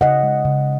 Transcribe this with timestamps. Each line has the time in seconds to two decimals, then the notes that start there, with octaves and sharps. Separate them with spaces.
0.01 C#3 D#5 F#5
0.23 G#3
0.45 C#3